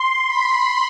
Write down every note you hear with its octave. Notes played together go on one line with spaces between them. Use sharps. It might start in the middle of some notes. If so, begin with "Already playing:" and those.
Already playing: C6
B5